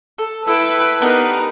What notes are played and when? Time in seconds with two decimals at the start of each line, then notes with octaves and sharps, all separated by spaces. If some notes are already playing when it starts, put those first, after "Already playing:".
0.18 A4
0.47 E4 A4 B4 G5
1.02 B3 D4 D#4 G4 A4 A#4 F#6